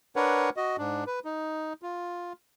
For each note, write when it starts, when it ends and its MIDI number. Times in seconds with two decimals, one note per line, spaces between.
0.16 0.50 62
0.16 0.50 70
0.16 0.50 71
0.16 0.50 73
0.16 0.50 78
0.57 0.77 66
0.57 0.77 75
0.78 1.04 44
0.78 1.04 62
1.07 1.20 71
1.25 1.73 63
1.82 2.33 65